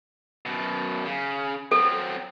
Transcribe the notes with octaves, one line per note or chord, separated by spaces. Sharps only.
F#2 B2
C#3
F#3 C4 A4